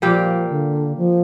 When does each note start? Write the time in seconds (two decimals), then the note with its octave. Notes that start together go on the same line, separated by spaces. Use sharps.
0.02 A#2 F3 G3 A#3 G4
0.50 D3
0.97 F3